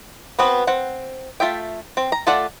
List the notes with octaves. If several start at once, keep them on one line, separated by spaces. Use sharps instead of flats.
B3 C4 F#4 B4
C4 F#5
A3 F4 E5 G5
C4
A#5
A3 F4 A4 D5 F#5